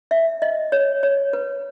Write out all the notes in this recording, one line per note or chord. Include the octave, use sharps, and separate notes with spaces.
E5
D#5
C#5
C#5
B4